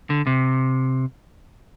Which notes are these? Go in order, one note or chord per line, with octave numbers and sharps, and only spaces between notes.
D3
C3